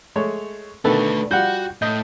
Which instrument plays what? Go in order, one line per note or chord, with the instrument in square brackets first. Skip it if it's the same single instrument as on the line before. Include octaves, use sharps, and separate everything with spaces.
[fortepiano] G#3 A3 C#5
[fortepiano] B2 D#3 [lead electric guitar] D3 A3 [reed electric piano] A4 B4
[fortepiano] G3 F4 [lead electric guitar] F#4 [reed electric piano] F#5 G5 G6
[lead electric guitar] A2 [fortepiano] D#5 [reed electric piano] G6